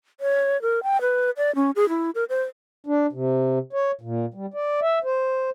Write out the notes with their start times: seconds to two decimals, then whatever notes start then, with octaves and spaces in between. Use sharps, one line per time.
0.20 C#5
0.62 A#4
0.83 G5
1.01 B4
1.37 D5
1.55 C#4
1.76 G#4
1.89 E4
2.15 A#4
2.29 C5
2.87 D4
3.13 C3
3.73 C#5
4.01 A#2
4.34 G3
4.54 D5
4.81 E5
5.04 C5